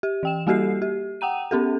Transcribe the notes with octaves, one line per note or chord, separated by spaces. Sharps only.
G4
E3 G5 E7
G3 A#3 F#4 G4 A4 C7
G4
F#5 G5 A#5 D#7
B3 C#4 G4 A4